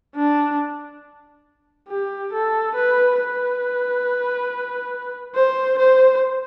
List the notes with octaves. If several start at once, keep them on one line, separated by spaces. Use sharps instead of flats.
D4
G4
A4
B4
B4
C5
C5